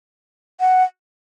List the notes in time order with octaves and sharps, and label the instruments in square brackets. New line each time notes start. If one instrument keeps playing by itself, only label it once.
[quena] F#5